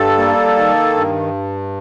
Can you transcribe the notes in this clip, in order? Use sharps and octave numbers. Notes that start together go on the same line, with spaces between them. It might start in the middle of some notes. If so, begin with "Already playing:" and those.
Already playing: G2 G3 A4
A#3
D#3
G2